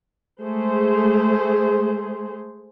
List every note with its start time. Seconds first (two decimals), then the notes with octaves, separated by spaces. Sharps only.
0.42 G#3 A3 G#4 C5